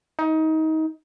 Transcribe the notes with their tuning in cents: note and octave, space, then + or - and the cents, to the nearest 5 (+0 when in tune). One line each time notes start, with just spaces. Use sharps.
D#4 +25